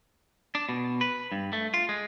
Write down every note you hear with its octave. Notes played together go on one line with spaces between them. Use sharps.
D4
B2
B4
G2
A3
F4
G#3